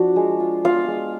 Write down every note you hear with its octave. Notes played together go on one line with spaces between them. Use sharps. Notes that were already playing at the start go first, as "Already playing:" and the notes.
Already playing: F3 D4 F#4
G#3
F4
B3 F4 F5
G#3